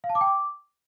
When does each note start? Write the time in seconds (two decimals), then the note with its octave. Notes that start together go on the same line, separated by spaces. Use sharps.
0.04 F5
0.09 A5
0.15 D6
0.21 G5
0.27 D6